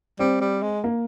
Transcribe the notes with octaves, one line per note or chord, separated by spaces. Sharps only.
G3 C4
G3
G#3
A#3